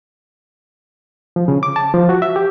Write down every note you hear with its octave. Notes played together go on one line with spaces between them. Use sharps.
F3
C#3
D6
A5
F3
F#4
E5
G4